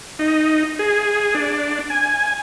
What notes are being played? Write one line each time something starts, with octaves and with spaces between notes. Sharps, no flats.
D#4
G#4
D4
G#5